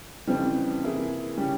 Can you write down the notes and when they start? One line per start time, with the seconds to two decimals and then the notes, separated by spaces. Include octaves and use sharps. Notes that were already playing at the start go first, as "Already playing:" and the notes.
0.27 F2 C#3 E3 G3 C4
0.83 C3 E3 A#3 E4 G#4
1.37 C#3 G3 C#4 G4